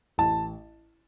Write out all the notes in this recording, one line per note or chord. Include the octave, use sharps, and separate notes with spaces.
A1 A5